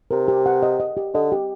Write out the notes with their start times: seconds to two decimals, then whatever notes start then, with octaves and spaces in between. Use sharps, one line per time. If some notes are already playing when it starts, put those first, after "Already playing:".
0.11 C3 A#4
0.28 G4
0.46 F#5
0.63 D#5
0.80 D#5
0.97 G4
1.14 D3 D#5
1.32 G4